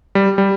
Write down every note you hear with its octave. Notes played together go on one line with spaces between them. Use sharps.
G3
G3